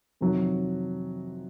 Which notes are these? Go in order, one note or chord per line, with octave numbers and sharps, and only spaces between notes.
F2 C3 D#3 F#3